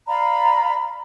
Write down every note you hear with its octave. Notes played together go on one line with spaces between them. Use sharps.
D5 F5 A#5 B5